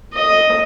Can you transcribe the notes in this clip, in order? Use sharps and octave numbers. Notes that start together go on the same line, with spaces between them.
D#5